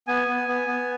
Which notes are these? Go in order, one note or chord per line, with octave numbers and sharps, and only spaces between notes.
B3 G#5
B3
B3
B3